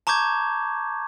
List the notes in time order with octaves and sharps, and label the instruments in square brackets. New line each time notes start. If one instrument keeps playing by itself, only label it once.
[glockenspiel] A5 A#5 C#6 D6 G6 G#6